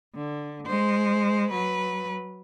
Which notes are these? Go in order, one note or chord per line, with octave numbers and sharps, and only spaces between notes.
D3
G#3 C5
F#3 B4